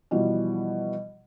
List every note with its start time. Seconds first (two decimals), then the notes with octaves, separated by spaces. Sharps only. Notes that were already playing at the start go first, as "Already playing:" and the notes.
0.11 B2 E3 F3 G3